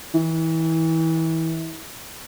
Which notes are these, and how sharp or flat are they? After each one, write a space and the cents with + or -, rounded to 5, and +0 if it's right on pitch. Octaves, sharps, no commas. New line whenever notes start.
E3 -30